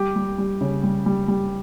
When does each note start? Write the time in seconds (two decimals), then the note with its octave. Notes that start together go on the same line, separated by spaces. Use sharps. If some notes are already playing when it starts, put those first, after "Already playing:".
Already playing: G3 G4
0.16 G3
0.38 G3
0.61 C#3
0.83 G3
1.06 G3
1.28 G3